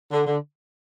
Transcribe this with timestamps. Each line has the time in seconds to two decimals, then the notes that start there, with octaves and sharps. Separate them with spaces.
0.12 D3
0.26 D3